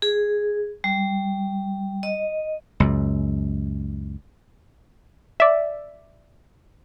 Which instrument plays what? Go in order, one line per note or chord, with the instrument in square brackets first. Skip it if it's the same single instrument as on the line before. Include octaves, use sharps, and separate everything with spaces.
[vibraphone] G#4
G3
D#5
[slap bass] C#2 F#2
[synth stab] D5 E5